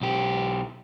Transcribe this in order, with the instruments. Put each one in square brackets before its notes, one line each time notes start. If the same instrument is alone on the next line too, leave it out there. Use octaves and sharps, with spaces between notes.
[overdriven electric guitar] B1 G4